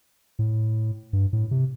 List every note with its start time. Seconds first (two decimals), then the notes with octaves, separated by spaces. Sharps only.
0.39 A2
1.13 G2
1.33 A2
1.51 C3